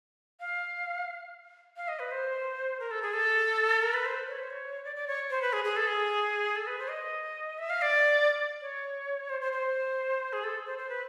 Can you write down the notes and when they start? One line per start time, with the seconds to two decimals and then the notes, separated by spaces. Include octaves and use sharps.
0.40 F5
1.77 F5
1.88 D#5
2.00 B4
2.11 C5
2.80 A#4
2.91 A4
3.02 G#4
3.14 A4
3.82 A#4
3.94 B4
4.05 C5
4.28 C#5
4.39 C5
4.50 C#5
4.85 D5
4.96 D5
5.08 C#5
5.30 C5
5.42 B4
5.53 G#4
5.64 G#4
5.76 A4
5.87 G#4
6.56 A4
6.67 B4
6.79 C5
6.90 D#5
7.58 E5
7.70 F5
7.82 D5
8.62 C#5
9.29 C5
9.41 C5
9.52 C5
10.33 G#4
10.44 A4
10.66 C5
10.78 C5
10.89 B4